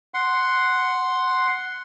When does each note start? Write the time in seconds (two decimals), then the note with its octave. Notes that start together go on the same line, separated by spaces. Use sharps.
0.14 F#5 C6